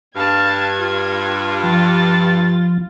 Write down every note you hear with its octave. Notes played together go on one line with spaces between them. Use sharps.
G2 F5 A5 G#6
F4
F3 A6